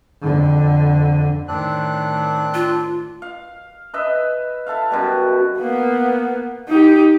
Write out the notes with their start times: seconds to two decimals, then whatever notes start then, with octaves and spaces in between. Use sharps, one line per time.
0.22 F2 D3
1.48 A2 D#3 C4 D4 F#6
2.54 F4
3.22 F5
3.94 B4 D#5 E5
4.66 E4 A4 E5 F5
4.90 F#2 B2 G3
5.59 A#3 B3
6.69 D#4 G4